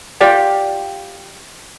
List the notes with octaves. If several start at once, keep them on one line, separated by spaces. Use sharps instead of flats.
F4 G4 D5 G5